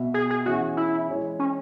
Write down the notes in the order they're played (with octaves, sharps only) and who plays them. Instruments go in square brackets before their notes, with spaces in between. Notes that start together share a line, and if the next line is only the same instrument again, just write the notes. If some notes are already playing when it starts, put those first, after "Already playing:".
Already playing: [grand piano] B2 B3 F#4 E5
[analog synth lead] G#4
G#4
[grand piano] E3 C#4 G#4 E5 [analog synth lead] F#4
[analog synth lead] E4
[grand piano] E3 G#3 E4 C#5
[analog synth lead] C#4